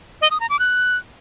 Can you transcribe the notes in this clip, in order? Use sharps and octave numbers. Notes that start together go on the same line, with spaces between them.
D#5
D#6
A#5
D6
F#6